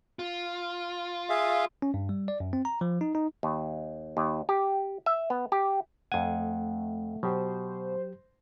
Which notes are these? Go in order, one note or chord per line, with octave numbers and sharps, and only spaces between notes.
F4
G#4 E5 F5
C#4
G2
G3
D5
F#2
C4
A#5
F3
D#4
D#4
D#2
D#2
G4
E5
B3
G4
F2 A3 F#5 G#5
B2 F#3 G4 C5